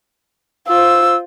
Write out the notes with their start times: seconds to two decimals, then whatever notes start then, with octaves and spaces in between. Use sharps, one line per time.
0.68 F4 C5 E6